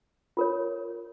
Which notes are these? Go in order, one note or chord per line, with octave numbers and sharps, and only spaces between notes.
F4 A#4 C#5